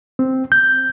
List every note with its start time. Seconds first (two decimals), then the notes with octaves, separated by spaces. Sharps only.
0.19 C4
0.52 G6